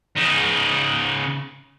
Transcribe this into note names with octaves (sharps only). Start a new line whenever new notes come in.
C#3 D#4